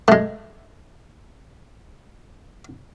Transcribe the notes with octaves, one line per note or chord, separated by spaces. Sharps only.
G#3 A3